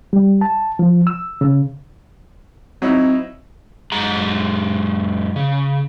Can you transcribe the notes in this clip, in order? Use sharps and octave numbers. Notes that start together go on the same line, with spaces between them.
G3
A5
F3
E6
C#3
F#3 C4 D#4 E4
F#2 G#3 A#5
C#3